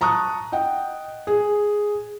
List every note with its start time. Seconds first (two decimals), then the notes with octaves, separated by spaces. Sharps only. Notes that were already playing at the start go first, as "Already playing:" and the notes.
0.01 A5 A#5 C#6 D#6 F#6
0.52 D#5 F#5 G5
1.27 G#4